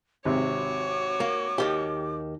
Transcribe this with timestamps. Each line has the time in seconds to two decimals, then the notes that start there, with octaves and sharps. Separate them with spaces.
0.25 G#1 C3 F#4 C#5 D6
1.20 A#3
1.58 D#2 D#3 G4